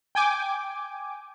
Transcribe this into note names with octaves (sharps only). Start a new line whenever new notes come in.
G5 G#5 D6